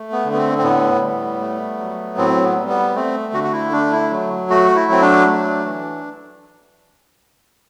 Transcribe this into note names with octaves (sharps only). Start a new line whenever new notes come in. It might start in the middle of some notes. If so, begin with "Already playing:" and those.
Already playing: A3
B3
D3
B3
C4
C4
A2 B3
G3
A3
F#3
A2 C4
B3
G3
B3
A3 C4
D3 F#4
F#4
E4
A3 D4
E4
F#3
A3 F#4
E4
F#3 C4
D4
A3
E3